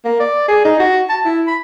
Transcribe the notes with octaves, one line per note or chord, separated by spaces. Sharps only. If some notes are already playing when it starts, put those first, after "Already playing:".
A#3
D5
G#4
D#4
F#4
A5
E4
B5